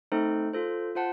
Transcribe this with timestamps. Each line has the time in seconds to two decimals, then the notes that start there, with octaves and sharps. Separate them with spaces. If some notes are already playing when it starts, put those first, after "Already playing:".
0.12 A3 C4 D#4 A4 C5
0.53 F4 A4 C5
0.95 F4 C5 F#5 A5